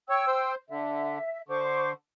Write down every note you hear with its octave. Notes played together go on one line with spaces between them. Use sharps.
C#5 G5 E6
C5
D3 E5
D3 C5 C#6 D6